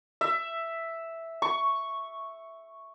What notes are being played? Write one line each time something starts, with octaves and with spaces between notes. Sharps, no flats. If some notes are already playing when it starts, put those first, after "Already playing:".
E5
C#6